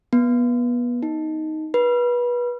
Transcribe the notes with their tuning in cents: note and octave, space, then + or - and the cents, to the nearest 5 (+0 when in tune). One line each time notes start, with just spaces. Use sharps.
B3 -25
D#4 +5
B4 -25